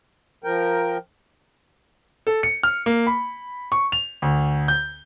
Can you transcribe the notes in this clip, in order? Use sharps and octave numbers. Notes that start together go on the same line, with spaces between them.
F3 A#4 G5
A4
C#7
F6
A#3
B5
C#6
F7
D2
G6